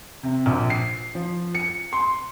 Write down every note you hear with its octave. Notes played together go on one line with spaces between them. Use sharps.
C3
A#1
C7
F3
C#7
C6